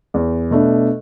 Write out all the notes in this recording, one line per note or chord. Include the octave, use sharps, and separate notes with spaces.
E2
B2 A3 D4